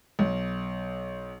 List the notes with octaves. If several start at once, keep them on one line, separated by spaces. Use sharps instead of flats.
B1